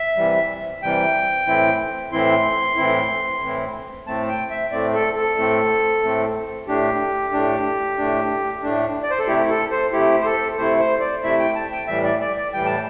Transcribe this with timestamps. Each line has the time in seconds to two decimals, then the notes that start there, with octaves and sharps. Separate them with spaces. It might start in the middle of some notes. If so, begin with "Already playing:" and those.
Already playing: E5
0.16 C3 E3 G3
0.83 C3 E3 G3 G5
1.47 A2 E3 C4 E4
2.12 A2 E3 C4 E4 C6
2.77 A2 E3 C4 E4
3.42 A2 E3 C4 E4
4.07 A2 A3 C4 A5
4.29 G5
4.50 E5
4.72 A2 A3 C4 D5
4.94 A4
5.16 A4
5.37 A2 A3 C4
6.03 A2 A3 C4
6.67 A2 A3 D4 G4
7.33 A2 A3 D4
7.98 A2 A3 D4
8.63 A2 A3 D4
9.03 D5
9.11 C5
9.19 A4
9.27 C3 A3 E4 G4
9.50 A4
9.71 C5
9.93 C3 A3 E4 G4
10.22 C5
10.25 A4
10.57 C3 A3 E4 C5
10.79 C5
11.00 D5
11.23 C3 A3 E4 E5
11.39 G5
11.55 A5
11.72 G5
11.87 A2 E3 G3 E5
12.04 D5
12.21 D5
12.37 D5
12.53 A2 E3 G3 G5
12.66 A5